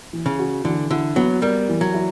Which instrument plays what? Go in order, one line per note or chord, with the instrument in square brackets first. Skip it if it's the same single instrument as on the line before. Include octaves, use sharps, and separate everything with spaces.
[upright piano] E3
[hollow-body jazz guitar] C#3
[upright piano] F#4
[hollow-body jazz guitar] D3 [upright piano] E3
[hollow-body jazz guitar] D3 [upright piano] E4
[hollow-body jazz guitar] F#3 [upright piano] B3
[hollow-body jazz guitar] G3 [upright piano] A#4
[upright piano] E3
[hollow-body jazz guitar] F#3
[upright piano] E4